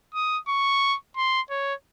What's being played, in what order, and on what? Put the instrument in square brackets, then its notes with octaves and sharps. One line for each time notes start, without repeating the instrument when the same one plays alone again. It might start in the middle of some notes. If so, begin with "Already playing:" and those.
[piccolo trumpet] D#6
C#6
C6
C#5